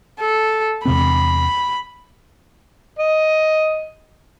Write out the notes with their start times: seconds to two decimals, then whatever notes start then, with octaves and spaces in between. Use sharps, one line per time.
0.20 A4
0.86 E2 C3 C4 B5
2.99 D#5